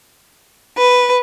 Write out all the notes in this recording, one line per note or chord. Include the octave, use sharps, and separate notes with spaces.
B4